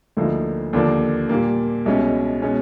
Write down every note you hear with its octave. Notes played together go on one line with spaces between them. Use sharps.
D2 D3 F3 A#3 D#4
D#2 D3 F3 A#3 D4
A#2 G3 A#3
C2 B2 G#3 C#4
B2 G#3 C#4